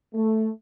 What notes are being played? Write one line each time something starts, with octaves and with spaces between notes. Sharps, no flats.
A3